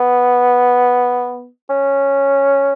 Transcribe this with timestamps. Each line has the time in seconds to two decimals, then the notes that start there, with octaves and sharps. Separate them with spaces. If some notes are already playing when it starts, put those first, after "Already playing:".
Already playing: B3
1.69 C#4